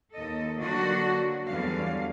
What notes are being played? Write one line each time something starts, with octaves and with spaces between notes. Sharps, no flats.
D#2 A4 D#5
D3 F#3 A#3 D4 F#4
E2 D3 F#3 G3 F5